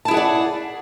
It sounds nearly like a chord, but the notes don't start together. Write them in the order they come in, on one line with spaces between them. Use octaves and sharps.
A5 E4 G#4 F#5 D5